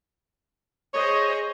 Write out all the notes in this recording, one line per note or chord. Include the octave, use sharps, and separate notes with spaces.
G#4 C5 C#5 D#5